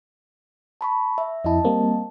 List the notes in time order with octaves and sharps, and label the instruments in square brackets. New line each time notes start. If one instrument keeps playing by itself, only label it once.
[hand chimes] A5 B5 C#6
E5
[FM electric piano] F2 E4 [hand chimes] D#5 A5
[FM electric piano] G3 A#3 C4